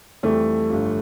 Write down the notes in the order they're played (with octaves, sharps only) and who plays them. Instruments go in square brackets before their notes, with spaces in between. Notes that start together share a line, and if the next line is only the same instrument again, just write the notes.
[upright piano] F2 E3 G3 [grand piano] A3
[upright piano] G1 G2 F3